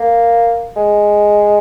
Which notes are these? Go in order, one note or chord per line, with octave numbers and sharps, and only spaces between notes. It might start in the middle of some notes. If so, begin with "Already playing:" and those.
Already playing: A#3
G#3